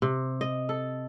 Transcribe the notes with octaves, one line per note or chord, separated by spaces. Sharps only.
C3
D#5
A4